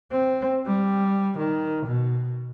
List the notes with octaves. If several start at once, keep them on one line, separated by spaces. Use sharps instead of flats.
C4
G3
D#3
B2